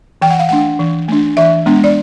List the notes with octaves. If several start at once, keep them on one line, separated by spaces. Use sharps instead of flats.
E3 G5
F#5
F5
A3 D4 F#5
E3
A3 D4
E3 E5
G#3 B3 D4
D5